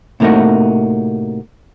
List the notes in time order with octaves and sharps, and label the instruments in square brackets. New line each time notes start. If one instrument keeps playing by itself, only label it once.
[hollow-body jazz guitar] A2 C3 A3 A#3 D#4 F#4